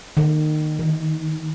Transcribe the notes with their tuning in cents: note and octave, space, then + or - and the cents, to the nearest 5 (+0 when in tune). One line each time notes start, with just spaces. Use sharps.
D#3 -25
D#3 +30